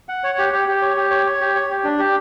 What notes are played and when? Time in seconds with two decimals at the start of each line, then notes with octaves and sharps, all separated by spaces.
0.09 F#5
0.24 C#5
0.38 G4
0.53 G4
0.68 G4
0.82 C#5
0.97 G4
1.11 C#5
1.26 C#5
1.40 G4
1.55 C#5
1.70 G4
1.84 D4
1.99 G4